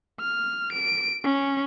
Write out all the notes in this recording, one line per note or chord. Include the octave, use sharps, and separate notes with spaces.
F6
D7
C#4